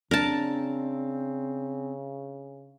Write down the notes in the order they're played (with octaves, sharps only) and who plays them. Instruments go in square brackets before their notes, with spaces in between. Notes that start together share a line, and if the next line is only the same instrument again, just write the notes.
[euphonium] C#3 [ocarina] C4 [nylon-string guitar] D4 [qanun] A#4 A5